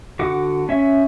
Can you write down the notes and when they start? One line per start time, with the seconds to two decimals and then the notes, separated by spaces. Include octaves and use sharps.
0.19 D3 F#4 F#5 D6
0.69 C#4 E5